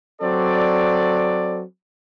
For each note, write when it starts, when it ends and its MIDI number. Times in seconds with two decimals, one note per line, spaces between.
0.21 1.61 54
0.21 1.61 60
0.21 1.61 69
0.21 1.61 74